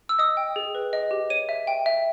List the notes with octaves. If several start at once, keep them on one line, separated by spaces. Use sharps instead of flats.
E6
D#5 D#6
G5
G#4
B4
D#5
G4
C#5 D#7
E5
G5
E5